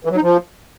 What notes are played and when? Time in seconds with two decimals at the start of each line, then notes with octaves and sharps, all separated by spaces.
0.05 E3
0.11 F#3
0.17 D#4
0.22 F3